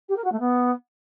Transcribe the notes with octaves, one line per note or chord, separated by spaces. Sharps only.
G4
A#4
F#4
A3
B3